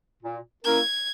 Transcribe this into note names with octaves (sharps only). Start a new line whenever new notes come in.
A#2
A#3 C#4 E4 A#4 G#6